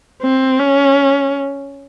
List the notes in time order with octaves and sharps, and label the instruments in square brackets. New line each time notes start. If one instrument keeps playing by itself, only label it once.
[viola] C4
C#4